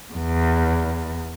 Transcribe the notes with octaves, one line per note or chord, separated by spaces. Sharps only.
E2